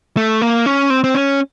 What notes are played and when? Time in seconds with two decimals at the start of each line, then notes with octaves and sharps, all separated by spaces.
0.17 A3
0.42 A#3
0.66 C#4
0.90 C4
1.04 C4
1.15 C#4